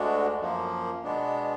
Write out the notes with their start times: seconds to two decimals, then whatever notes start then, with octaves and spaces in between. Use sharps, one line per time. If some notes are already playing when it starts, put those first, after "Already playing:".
Already playing: D2 D3 G#3 D4 F#4
0.40 F#2 F3 A#3
1.04 B2 G#3 B3 D4